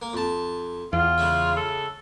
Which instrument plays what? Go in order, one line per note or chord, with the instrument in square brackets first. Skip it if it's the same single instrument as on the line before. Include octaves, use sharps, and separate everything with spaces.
[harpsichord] A#3
F2 A5
[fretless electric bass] E2 [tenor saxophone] F4
[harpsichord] C#3 G#3 E5
[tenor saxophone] A4